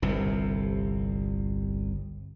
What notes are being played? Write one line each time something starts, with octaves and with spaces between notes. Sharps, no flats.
G1 C2 C3